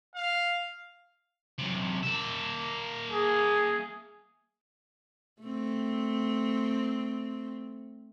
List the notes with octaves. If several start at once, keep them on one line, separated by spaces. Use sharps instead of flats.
F5
F#2 C3
A#3 E5
G#4
A3 C4